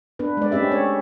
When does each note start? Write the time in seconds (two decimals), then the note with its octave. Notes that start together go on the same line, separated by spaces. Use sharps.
0.19 B3 D4 B4
0.37 G#3 D5
0.52 A3 C4 C#4 G4 E5
0.72 C#5